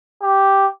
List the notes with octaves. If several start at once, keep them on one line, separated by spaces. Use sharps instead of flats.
G4